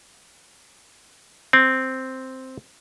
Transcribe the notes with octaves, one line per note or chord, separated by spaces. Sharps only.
C4